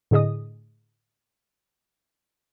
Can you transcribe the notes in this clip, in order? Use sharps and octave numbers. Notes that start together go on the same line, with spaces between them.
A2 D3 G#4 D#5 D#6